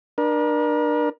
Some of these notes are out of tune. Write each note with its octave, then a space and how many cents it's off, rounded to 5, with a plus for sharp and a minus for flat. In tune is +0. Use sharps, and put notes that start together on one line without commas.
D4 +25 A#4 +40